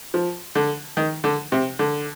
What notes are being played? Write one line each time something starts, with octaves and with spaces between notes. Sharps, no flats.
F3
D3
D#3
D3
C3
D3